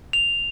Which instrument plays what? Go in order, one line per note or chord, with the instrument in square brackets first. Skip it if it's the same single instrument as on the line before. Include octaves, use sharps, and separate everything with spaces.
[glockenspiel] F7